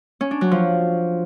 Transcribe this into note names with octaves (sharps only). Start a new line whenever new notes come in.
C#4
D4
F#3
F3